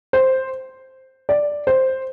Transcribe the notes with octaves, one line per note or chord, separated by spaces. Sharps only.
C5
D5
C5